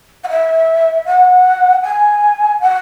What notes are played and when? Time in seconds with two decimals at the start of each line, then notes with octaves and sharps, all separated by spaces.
0.24 F#5
0.29 E5
1.06 F#5
1.83 G#5
2.61 F#5